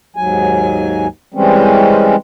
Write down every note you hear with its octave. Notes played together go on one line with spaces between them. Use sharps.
D#2 G#2 F#3 G#5
E3 G3 G#3 C4 C#4